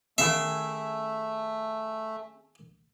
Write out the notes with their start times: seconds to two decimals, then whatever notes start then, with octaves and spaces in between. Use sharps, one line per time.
0.18 D#3 A3 C#4 G#4 E5 F5 G5